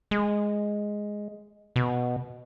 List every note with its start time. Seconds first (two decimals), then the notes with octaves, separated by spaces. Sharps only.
0.11 G#3
1.76 B2